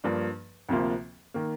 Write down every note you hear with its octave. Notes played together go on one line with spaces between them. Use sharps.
G2 F3 A#3 D4
D2 C3 F3 A#3 F4
D#3 A#3